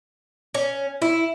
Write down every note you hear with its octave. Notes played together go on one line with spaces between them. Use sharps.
C#4
E4